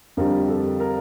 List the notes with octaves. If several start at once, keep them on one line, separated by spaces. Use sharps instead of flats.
F2 D3 G3 A#4
A4
A#4